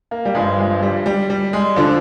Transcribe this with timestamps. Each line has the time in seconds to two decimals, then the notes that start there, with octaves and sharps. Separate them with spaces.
0.11 A#3
0.25 G3
0.35 G1 G2 F3 G#3
0.59 G#3
0.82 G3
1.06 G3
1.30 G3
1.53 G#3
1.76 D3 F3 D4